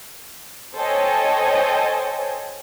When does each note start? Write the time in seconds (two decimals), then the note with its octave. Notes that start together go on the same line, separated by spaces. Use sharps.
0.76 A4 C5 C#5 D#5 G5 G#5